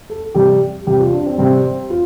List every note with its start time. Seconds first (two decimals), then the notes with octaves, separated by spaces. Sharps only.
0.10 A4
0.35 C3 G3 G4
0.87 C3 G3 G4
1.00 F4
1.13 D4
1.26 C4
1.38 C3 G3 C4
1.90 F4